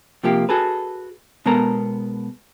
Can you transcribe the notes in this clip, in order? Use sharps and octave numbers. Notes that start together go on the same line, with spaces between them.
C3 F3 A#3 G4
F#4 G#4 A4 B4
B2 G#3 B3 A4 A#4 A#5